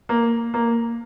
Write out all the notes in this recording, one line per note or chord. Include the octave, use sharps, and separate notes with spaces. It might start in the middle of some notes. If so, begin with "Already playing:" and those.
A#3
A#3